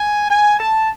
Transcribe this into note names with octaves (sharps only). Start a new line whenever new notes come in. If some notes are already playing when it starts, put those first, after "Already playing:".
Already playing: G#5
G#5
A5